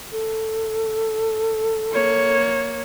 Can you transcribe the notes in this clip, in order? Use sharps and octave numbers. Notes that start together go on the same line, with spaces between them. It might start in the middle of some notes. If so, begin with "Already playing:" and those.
A4
A#3 C#5